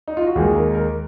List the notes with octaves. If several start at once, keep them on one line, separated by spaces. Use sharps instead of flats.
D#4
F4
F#4
D#2 D#3 G#3 G#4
A#4
A#4